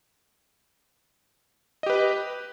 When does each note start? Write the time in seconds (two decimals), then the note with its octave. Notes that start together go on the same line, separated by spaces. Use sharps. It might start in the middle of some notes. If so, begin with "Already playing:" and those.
1.83 D#5
1.86 G4
1.90 B4